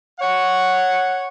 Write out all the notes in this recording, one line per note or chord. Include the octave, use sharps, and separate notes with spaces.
C#5 F#5